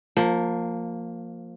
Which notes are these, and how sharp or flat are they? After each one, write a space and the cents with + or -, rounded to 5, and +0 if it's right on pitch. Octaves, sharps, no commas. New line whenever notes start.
F3 +10 A#3 -15